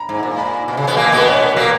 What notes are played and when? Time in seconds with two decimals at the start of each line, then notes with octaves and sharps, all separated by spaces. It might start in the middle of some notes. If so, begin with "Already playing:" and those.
Already playing: A#5 B5
0.09 G#2
0.23 A#2
0.38 B5
0.68 B2
0.77 C#3
0.87 B2 B3
0.97 A#2 A#3 G#5
1.08 G#5
1.12 B2 B3 B4
1.27 C#5
1.42 A#4
1.56 A#2 A#3 A#4